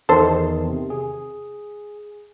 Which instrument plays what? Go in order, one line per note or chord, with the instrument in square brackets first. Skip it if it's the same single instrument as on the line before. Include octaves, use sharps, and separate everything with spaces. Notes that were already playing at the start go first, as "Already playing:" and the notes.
[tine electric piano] E2 D#3 [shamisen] A4 C5
[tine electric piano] C3
G#4